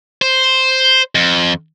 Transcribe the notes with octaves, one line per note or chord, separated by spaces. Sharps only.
C5
F2